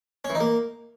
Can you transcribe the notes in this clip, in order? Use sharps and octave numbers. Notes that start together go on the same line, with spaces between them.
C#4
E3
D#4
A#3